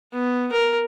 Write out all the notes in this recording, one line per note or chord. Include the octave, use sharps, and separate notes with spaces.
B3
A#4